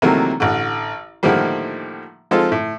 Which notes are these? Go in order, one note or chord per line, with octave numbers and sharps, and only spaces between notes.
C3 D#3 E3 F#3 A3 A#3
A1 D3
A2 D3 D#3 F3 G3 A#3
F3 G#3 C4 D#4 F4 A4
A2